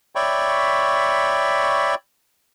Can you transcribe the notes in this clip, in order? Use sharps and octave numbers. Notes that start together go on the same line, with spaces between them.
C#5 D5 E5 G5 B5 C#6